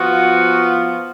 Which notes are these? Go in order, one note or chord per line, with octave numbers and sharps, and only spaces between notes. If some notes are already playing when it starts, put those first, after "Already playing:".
Already playing: F3 B3 F4 F#4